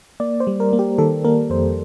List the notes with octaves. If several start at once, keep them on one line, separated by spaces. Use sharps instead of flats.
A#3 D5
C5
G3
A#4
A#3
G4
D#3 A4
A#3 A#4
F2 C5